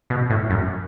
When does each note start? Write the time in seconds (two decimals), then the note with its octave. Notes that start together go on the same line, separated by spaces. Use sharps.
0.10 B2
0.30 A2
0.50 F#2